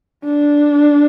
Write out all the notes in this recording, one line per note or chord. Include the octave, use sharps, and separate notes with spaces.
D4